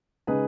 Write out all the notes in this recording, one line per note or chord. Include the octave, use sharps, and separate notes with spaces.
C#3 G#3 D#4 G#4 B4